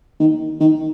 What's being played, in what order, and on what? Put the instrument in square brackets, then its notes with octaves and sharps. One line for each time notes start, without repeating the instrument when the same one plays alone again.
[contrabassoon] D#3
D#3